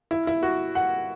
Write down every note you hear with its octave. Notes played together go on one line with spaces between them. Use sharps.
E4
E4
F#4
F#5